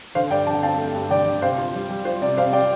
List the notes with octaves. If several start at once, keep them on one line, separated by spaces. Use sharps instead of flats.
D3 C5 F5
G2 D5 G5
D3 A5
G5
C4 F5 A5
A3
G2
D3 D5 G5
D3
C3 C5 F5
F4
G3
G3
F4 C5
C3 D5
C3 C5 F5
C3 D5 G5